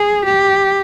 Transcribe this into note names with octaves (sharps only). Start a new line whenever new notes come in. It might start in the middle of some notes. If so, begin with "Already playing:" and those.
Already playing: G#4
G4